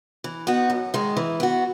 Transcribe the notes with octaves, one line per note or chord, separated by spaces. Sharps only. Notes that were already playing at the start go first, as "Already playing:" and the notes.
E3
B3 D#4 F#4
F#2
D#3 G#3
E3
B3 F#4